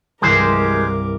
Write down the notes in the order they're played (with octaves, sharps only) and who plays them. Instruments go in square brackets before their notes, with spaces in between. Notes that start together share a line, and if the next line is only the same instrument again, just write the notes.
[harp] C2 G2 E3 [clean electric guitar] G#3 G4 C5 [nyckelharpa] A#4 D6